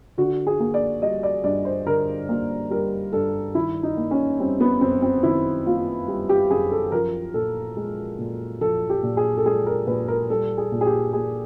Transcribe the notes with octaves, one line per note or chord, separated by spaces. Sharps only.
D3 F#4
G#4
A#3
D5
G3 D#5
D5
G2 D5
C5
D3 A#4
A#3
G3 A#4
G2 A4
D#3 E4
D#4
A#3
C#4
G3 C4
B3
F#2 C4
C4
D#3 E4
A#3 F4
G3
G4
F#2 G#4
A4
F3 A#4
A#2 A4
G#3
A#2
F3 A4
G4
A#2
G#4
A4
G#3 G#4
A#4
A#2 B4
A#4
G3 A4
G#4
A#2
G#4
G4
A#3 G#4